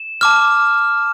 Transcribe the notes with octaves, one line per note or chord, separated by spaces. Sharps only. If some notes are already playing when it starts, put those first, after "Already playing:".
Already playing: E7
A5 D6 F6